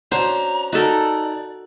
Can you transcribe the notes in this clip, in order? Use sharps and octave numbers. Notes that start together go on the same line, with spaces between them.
C#4 D4 F#4 C5 A#5
D#4 F#4 A4 A#4 D5